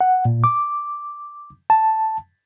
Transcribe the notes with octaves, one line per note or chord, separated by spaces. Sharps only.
F#5
A#2
D6
A5